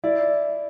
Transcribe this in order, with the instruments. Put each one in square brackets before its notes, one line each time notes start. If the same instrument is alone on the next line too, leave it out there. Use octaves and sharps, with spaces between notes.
[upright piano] E4 [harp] D5